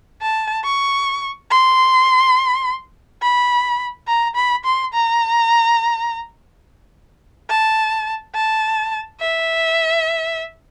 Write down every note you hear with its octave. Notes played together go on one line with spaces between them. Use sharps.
A5
C#6
C6
B5
A#5
B5
C6
A#5
A5
A5
E5